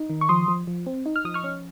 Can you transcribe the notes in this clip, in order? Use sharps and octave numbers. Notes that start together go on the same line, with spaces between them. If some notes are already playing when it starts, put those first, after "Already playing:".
Already playing: D#4
D#3
C#6
F3 C6 D#6
F3
F3
C4
D#4
F6
F3 D#6
C#6 F6
C#4